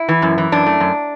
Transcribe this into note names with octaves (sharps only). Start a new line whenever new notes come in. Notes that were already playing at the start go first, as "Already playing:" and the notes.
Already playing: E4
E3
F#2
E3
F#2 D4
A3
F#2